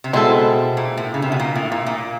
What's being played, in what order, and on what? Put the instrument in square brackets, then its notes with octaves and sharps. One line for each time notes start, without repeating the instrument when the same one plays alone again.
[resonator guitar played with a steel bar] C3
[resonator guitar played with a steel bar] B2 [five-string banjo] G#3 C4 E4 A4
[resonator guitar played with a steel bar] A#2
A2
C#3
C3
B2
A#2
A2
A#2
A#2